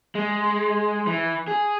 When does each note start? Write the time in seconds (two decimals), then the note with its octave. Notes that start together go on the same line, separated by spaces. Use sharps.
0.15 G#3
1.07 E3
1.48 G#4